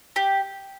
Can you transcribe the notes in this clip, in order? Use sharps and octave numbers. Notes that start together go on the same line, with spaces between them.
G4